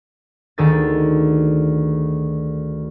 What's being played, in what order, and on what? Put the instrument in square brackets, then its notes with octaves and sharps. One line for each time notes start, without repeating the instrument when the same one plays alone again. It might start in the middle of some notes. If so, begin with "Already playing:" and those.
[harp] D2 D#3 G#4 E6 A6